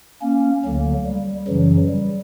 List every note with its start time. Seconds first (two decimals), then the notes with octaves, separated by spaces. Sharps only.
0.22 A#3 C#4
0.64 D2 D3 F#3 A#3
1.06 G3
1.47 F#2 C#3 E3 F#3
1.89 G3